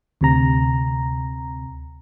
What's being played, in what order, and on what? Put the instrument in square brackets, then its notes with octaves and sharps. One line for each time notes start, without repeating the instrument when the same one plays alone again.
[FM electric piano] D2 C3 A#5